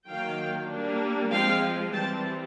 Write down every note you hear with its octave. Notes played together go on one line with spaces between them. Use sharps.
D#3 F#3 A#3 F5 G5
G3 A#3 D4
F3 G#3 C4 F5 G5
E3 G3 C4 G5 A5